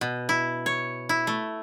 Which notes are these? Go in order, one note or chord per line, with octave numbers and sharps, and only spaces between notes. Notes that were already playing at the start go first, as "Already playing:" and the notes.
B2
E4
C#5
E4
A3